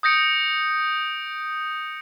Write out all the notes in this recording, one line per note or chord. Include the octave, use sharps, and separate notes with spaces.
D#6 G6 A#6 C#7 D7